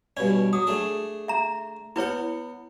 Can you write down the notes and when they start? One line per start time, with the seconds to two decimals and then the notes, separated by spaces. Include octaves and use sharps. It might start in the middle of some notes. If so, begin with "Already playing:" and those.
0.17 G2 B2 C#4 D5
0.53 F#3 D#6
0.67 A3 D4 G#4
1.28 E5 A#5
1.96 B3 E4 B4 C#5 F#5